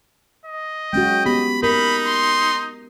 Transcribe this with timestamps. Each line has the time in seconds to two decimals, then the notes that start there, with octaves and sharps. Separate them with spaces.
0.46 D#5
0.93 G#3 C#4 F#4 G5
1.26 B3 G4 B5
1.63 D#4 A#4 B5
2.07 C6